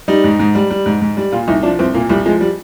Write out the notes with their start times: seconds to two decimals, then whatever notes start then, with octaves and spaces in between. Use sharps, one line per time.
0.08 G3 D#4
0.24 G#2
0.39 G#2
0.55 G3
0.70 G3
0.86 G#2
1.01 G#2
1.17 G3
1.32 A#2 F4
1.48 C2 D#4
1.63 F3 D4
1.79 C2 C4
1.94 A#2 A#3
2.10 C2 G3
2.26 F3 G#3
2.41 G3